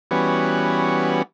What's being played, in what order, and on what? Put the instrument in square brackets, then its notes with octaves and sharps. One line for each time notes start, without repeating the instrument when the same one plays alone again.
[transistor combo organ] E3 G3 B3 C#4 F#4